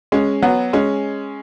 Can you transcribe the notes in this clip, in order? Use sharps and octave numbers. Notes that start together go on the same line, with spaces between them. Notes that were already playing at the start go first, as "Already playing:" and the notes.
G#3 C#4
F#3 B3
G#3 C#4